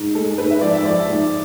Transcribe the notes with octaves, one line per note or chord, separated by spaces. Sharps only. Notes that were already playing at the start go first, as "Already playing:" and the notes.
Already playing: G#2
G#3 A4
G#2 B4
E5
F3 D5
E5
F3 D5
G#2